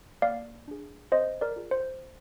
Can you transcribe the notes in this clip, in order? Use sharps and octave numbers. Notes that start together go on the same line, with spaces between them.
A#3 D5 F5
D4 G#4
C4 C5 D#5
A#4 D5
F4 G#4
C5